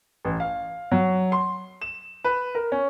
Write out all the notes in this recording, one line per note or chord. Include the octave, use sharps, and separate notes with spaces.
A1
F5
F#3
C6
E7
B4
A#4
C#4